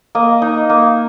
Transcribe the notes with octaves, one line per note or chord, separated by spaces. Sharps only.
A#3 D#5
D#4
A#3